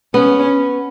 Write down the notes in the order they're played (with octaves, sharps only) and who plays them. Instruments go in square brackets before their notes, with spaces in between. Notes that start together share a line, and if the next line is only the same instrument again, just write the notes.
[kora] B3 [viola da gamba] C#4